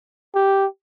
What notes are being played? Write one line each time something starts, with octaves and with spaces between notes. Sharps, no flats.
G4